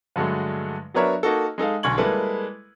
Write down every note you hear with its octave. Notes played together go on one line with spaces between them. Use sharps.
G2 D3 F#3 G#3 A3
F#3 B3 D4 A#4 C#5 E5
A#3 D#4 F#4 A4
G#3 D#4 A4 F5
B1 D3 G#5 C#6 G#6 F#7
G3 G#3 A#3 E4 A4 B4